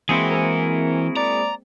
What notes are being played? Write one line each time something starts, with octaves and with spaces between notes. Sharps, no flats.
E3 G#3 A#3 C4 E4 F#4 G#4
A#4
D5 A#5